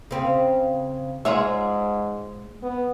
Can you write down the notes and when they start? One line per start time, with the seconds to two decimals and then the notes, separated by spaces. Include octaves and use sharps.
0.11 C#3 C4
1.25 G#2 G#3 F4 G#4 C#5 E5
2.63 B3